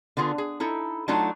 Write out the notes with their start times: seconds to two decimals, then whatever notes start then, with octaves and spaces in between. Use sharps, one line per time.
0.17 D3 B3 F4 G#4
0.38 G#4
0.60 D#4 E4 A4
1.08 F#3 A3 D4 D#4 F4 F#4